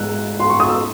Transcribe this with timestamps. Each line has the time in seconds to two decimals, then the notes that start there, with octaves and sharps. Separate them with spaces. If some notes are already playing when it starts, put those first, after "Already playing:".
Already playing: G#2 G#3 E6 F#6
0.40 C6
0.50 C#6
0.60 D#6
0.69 E6